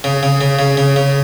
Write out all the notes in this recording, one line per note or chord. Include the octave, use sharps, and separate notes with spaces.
C#3
C#3
C#3
C#3
C#3
C#3